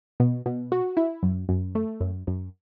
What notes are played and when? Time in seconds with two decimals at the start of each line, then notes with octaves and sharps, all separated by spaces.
0.20 B2
0.46 B2
0.72 F#4
0.97 E4
1.23 F#2
1.49 F#2
1.75 A3
2.01 F#2
2.27 F#2